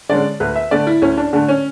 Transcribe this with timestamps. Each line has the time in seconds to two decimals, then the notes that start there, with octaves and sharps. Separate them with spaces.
0.09 D3 G#3 C#4 D5
0.40 D2 B4
0.56 E5
0.71 D3 A3 D5
0.87 E4
1.02 D2 C#4
1.17 D4
1.33 D3 A3 D4
1.48 C#4